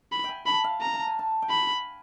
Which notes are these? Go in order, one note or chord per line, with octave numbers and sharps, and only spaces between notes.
B5
G5 G#5
A5 B5
F5
A#5
A5
G#5
A5
G5
G#5 B5